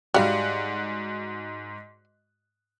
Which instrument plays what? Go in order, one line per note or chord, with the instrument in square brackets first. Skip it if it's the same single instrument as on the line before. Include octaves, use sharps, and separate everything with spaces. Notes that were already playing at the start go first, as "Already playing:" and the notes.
[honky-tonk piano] G#2 F#4 [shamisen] G3 F5